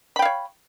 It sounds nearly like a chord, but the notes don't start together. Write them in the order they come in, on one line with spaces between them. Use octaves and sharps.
B5 G5 F5 C#5